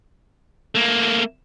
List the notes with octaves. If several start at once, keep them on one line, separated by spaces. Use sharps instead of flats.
A3 A#3